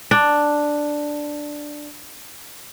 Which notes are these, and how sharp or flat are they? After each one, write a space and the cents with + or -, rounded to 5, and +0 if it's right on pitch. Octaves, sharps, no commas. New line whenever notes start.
D4 +5